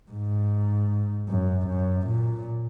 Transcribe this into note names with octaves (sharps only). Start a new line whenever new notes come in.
G#2
F#2
F#2
A#2